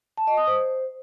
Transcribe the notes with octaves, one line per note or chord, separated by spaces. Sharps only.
A5
D#5
D#6
C5